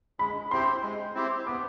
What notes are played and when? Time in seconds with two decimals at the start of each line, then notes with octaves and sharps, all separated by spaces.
0.19 G#3 B5
0.51 C4 E4 G4 C5 C6
0.83 G#3
1.15 C4 E4 G4 C5
1.47 B3 D6